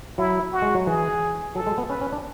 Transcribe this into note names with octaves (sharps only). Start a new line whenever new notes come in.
F#3 E4
F#4
G#3
F#3
E3 G#4
F#3 A4
G#3
B3
C#4 B4
C#4
D4